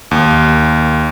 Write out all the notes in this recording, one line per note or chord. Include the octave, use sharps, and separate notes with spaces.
D#2